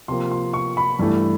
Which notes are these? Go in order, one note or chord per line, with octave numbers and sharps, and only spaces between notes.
C3 F3 A#3 C6
C6
C#6
B5
G2 E3 A3